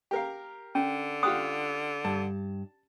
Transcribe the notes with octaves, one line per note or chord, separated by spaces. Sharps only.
G4 A#4 F5
D3 C#4
F4 G4 F#5 D#6
G2 A5